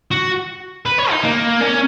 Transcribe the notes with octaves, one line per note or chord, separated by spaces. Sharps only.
F#4
B4
C#5
D#4
A#3
C#4